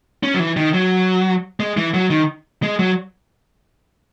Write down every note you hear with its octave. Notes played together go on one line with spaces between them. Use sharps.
C#4
F#3
E3
D#3
F#3
G#3
E3
F#3
D#3
G#3
F#3